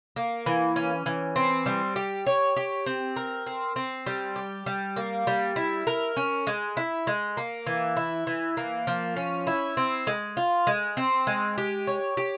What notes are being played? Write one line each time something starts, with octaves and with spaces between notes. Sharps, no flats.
A#3
E3
C#4
E3
C4
G3
G4
C#5
G4
C4
A#4
C4
C4
G3
G4
G3
A#3
G3
E4
A#4
C#4
G#3
E4
G#3
A#3
E3
E4
E3
A#3
F3
C#4
E4
C4
G#3
F4
G#3
C4
G#3
G4
C#5
G4